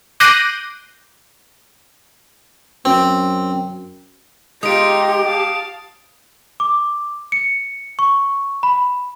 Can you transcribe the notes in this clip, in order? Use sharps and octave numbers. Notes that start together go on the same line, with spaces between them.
D6 F#6 G6 A#6 C7 D#7
F#2 C4
G#3 D#4 F4 G4 D#6 D7
F5 A5
D6
C#7
C#6
B5